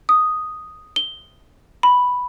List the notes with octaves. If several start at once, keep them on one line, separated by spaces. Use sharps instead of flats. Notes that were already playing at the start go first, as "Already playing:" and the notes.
D#6
G7
B5